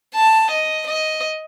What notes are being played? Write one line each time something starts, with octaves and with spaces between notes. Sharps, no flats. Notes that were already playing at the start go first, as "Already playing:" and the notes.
A5
D#5
D#5